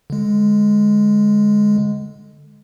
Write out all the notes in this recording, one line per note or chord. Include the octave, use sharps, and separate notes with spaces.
D3 G#3